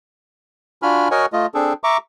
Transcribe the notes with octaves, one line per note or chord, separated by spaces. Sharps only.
D4 F4 F#4 G#5 B5 F6
F#4 A#4 C#5 D#5 F#5 G#5
A3 F4 D#5
C4 D4 G#4 A4
E5 A#5 C#6 D6